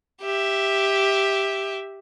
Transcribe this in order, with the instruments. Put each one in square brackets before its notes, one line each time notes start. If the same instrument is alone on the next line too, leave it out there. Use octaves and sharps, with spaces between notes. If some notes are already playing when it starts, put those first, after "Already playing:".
[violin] G4 E5